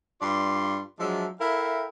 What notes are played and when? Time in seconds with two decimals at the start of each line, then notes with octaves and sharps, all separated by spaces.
0.22 G2 F4 D5 C6
0.99 F3 F#3 G#3 D4 E5
1.40 E4 A4 A#4 E5 F5 G5